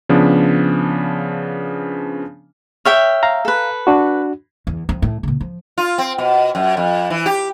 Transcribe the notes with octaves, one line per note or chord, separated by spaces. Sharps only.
C#3 F3 B3 D4
C#5 E5 G5 F6
F5 A#5
A4 B4
D4 F#4
E2
F2
A2
A#2 C#3
F3
F4
C4
B2
F#2
F2
E3
G4